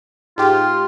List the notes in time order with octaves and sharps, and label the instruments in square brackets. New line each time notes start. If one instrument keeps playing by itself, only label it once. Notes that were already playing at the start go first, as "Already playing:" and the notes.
[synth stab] G#2 G4 [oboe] F4